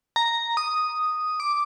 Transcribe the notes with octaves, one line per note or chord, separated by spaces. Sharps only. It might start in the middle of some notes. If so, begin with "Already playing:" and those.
A#5
D#6
D6